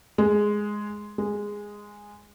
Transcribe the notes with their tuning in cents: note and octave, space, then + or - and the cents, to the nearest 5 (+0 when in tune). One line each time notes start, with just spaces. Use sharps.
G#3 +0
G#3 -10